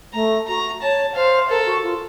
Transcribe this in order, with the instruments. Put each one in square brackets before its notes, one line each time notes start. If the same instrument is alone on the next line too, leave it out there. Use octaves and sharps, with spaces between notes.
[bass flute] A3 [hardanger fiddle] A#5
[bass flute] F#4 [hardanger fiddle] A#5
[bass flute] C#5 [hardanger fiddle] A5
[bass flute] C5 [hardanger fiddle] F5
[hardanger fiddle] A4 [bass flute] A#4
[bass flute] F#4
F4